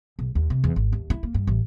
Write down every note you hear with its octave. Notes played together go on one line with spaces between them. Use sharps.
B1
D#2
C3
E2
G#1
D#2
E4
A#3
G2
A1